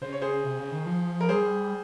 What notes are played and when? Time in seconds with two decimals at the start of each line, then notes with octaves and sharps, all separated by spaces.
0.02 C#3 C5
0.12 C#5
0.21 G#4 C5
0.44 C3
0.59 C#3
0.72 D#3
0.86 F3
1.21 A#4
1.29 G3 G#4 C5